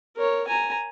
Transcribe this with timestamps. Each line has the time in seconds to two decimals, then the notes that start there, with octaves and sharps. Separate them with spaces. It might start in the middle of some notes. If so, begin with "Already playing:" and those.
0.17 A#4 C#5
0.48 G#5 A#5